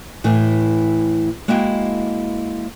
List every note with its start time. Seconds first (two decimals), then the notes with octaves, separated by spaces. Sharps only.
0.24 A2 E3 A3
1.48 G#3 A#3 E4 F#4 D#5 G5